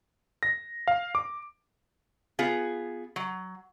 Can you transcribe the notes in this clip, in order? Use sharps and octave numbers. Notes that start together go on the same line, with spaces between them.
A#6
F5
D6
B3 F4 G#4
F#3